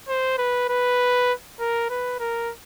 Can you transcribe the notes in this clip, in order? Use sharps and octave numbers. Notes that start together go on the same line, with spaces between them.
C5
B4
B4
A#4
B4
A#4